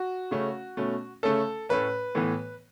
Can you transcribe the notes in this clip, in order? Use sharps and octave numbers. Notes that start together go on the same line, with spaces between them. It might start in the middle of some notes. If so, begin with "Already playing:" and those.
Already playing: F#4
C#3 A3 C#4
B2 A3 C#4
C#3 A3 C#4 A4
A2 A3 C#4 B4
A2 E3 B3